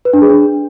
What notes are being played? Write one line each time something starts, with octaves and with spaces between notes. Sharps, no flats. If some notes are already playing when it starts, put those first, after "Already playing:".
B4
D4
G#4
D4